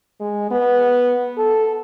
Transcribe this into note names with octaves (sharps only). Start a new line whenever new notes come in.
G#3
B3
A4